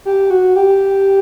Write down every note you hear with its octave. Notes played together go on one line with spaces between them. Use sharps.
G4
F#4
G4